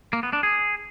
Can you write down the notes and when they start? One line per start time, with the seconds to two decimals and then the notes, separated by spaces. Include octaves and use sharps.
0.13 A#3
0.23 B3
0.33 D4
0.43 G#4